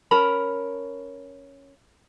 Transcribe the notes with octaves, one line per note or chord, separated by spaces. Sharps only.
C#4 A#4 A5 B5